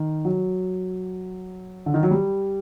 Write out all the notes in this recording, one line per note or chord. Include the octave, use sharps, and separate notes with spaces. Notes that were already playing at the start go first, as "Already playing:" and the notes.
Already playing: D#3
F#3
D3
D#3
F#3
G3